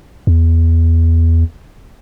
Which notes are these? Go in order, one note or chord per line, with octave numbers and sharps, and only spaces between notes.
E2